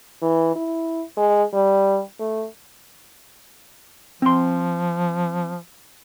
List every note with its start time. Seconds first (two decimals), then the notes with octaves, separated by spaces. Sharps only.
0.22 E3
0.55 E4
1.17 G#3
1.54 G3
2.20 A3
4.22 F3 C4 C6